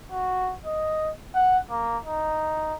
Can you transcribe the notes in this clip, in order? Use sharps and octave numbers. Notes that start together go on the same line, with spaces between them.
F#4
D#5
F#5
A#3
D#4